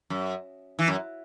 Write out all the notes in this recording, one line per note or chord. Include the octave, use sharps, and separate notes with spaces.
F#2
E3
F#2